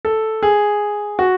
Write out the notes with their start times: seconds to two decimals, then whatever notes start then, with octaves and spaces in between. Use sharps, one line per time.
0.05 A4
0.43 G#4
1.19 F#4